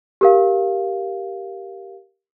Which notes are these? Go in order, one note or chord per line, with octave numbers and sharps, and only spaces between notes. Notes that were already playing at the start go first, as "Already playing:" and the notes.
G4 A#4 F5